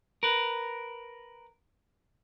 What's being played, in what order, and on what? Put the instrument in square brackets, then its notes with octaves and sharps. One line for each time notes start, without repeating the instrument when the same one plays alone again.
[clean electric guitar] A#4 B4